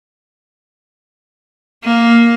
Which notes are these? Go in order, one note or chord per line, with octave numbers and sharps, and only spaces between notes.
A#3